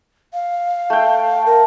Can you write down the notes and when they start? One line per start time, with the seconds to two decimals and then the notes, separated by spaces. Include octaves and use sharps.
0.33 F5
0.90 A3 G5
1.46 A#4